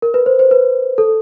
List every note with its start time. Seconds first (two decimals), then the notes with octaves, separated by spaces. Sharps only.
0.02 A#4
0.14 B4
0.26 C5
0.39 C5
0.51 B4
0.98 A4